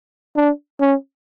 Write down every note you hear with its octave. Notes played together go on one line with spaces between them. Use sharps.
D4
C#4